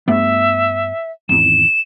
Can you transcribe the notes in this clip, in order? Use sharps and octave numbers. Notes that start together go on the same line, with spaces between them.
G2 A3 B3 E5
G#1 E2 E7